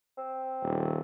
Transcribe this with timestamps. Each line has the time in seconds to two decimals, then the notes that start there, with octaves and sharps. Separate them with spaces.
0.18 C4
0.63 D#1